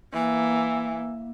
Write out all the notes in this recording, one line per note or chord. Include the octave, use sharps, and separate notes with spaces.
E3 A#3